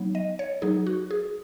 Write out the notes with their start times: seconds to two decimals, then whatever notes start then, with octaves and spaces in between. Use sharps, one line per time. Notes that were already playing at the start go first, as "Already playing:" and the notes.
Already playing: F#3 B3 D#4
0.15 D#5
0.39 C#5
0.62 F#3 D#4 G#4
0.87 F#4
1.11 G#4